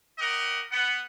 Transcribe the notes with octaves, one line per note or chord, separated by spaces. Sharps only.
G4 A#4 D#5 F#5
B3 F#5